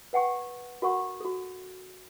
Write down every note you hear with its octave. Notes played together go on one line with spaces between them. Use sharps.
B4 F#5 G5 C#6
F#4 A#4 F#5 C#6
F#4 A4